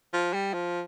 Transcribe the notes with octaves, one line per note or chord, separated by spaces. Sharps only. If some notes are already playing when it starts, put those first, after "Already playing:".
F3
G3
F3